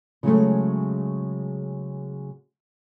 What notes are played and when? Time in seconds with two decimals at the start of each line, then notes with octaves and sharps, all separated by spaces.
0.23 C#3 F#3 G#3 A3